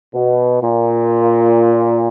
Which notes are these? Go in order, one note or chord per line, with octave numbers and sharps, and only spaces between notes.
B2
A#2